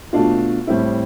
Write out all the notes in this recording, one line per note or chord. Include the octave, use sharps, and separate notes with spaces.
B2 A3 D4 F4
A2 G3 C4 E4